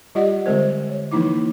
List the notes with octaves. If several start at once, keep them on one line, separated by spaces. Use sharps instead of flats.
G3 F4 G4 D5 D#5 F#5
D3 G3 G#3 C4 A#4 C5
C#5
E3 F3 A#3 D#4 E4 D6